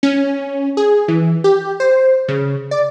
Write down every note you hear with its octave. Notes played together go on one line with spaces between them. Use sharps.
C#4
G#4
E3
G4
C5
C#3
D5